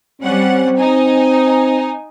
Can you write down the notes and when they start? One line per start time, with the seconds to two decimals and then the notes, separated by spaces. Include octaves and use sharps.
0.22 G3 C4 C#4 F#5
0.78 D#4 G#5